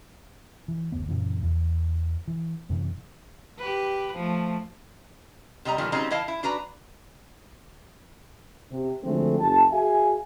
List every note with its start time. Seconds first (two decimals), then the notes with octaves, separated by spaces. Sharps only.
0.68 E3
0.92 F#1 D2 D3 B3
1.08 F#2 A#2 C#3 E3
1.42 E2
2.28 E3
2.70 F#2 C3 E3
3.58 G4 B4
4.15 F3 A3
5.65 C3 G3 D#5 A#5
5.78 A#2 D#3 F3 G3 A3 B3
5.92 C#3 F#3 G3 C4 D#4
6.10 E3 E4 D#5 F5 A5
6.28 E4
6.43 D4 F#4 B4 A#5
8.72 C3
9.04 D3 F3 F#3 G#3 A3 C4
9.40 F#1 A5
9.71 F#4 G#4 E5 F5 G#5